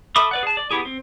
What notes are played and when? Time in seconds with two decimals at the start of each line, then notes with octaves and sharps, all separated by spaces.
0.16 A4 E5 B5 D6 D#6
0.31 B4 D5 F#5
0.43 G#4 A5
0.57 D5
0.71 B3 E4 G4 G#4
0.85 C4